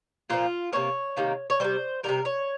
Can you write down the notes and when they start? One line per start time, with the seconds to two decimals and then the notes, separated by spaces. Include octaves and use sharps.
0.30 A#2 F3 C4 F4
0.73 C3 D#3 A#3 C#5
1.16 C3 D#3 A#3
1.50 C#5
1.60 D#3 G3 C5
1.64 C3
2.03 D#3 G3 A#4
2.09 C3
2.25 C#5